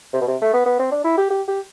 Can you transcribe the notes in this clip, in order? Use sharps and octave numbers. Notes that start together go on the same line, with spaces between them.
C3
B2
C3
A3
B3
B3
C4
D4
E4
G4
G4
G4